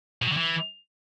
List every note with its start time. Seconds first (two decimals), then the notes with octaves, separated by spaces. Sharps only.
0.22 B2
0.27 F#3
0.32 D3
0.37 E3